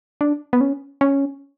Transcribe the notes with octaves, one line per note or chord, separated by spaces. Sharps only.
D4
B3
C#4
C#4